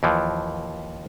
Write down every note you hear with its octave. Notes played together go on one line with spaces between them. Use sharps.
D#2 E3 F3